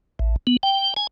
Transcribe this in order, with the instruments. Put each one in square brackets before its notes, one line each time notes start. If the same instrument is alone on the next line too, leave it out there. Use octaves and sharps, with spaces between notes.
[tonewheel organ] A1
B3
G5
G#5